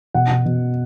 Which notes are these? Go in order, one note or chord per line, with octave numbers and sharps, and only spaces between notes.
B2 F#5
B2
B2